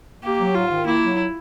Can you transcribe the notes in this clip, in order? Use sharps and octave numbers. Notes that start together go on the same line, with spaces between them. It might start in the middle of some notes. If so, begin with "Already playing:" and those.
A#3 G4
F#3
G#2 F4
D#3
A#3 E4
F#3